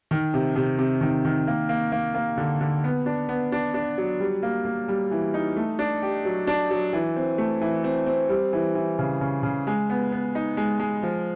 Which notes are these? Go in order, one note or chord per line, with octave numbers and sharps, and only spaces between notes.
D#3
C3
C3
C3
D#3
D#3
A#3
A#3
A#3
A#3
D3
D3
B3
D4
B3
D4
D4
F#3
G3
A#3
A#3
G3
E3
D#4
A3
D4
G4
F#3
D4
F#3
E3
C4
A3
E3
C4
C4
G3
E3
E3
C#3
C#3
C#3
G#3
B3
B3
D#4
G#3
G#3
F3